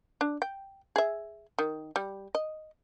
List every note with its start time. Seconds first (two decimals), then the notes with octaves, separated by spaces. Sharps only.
0.21 D4
0.42 G5
0.96 G#4 E5
1.59 D#3
1.96 G3
2.35 D#5